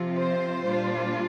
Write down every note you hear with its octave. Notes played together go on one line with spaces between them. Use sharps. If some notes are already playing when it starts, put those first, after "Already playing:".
Already playing: C3 F3 C4 F4
C5
A#2 G3 D4 F4